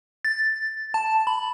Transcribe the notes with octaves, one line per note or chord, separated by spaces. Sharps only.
A6
A5
B5